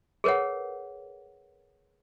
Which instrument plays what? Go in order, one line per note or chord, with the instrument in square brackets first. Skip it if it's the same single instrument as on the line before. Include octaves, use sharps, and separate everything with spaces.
[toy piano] G#4 A#4 B4 C#5 F#5